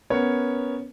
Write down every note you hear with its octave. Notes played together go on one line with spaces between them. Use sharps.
B3 C#4 A#4 C#5